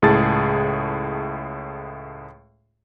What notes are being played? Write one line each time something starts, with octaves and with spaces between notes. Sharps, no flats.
C#2 A2 G#4 A5 A6